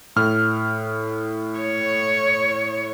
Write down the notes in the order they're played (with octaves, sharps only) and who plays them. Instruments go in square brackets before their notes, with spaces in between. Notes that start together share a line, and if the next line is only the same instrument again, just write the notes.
[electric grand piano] A2 F6
[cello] C#5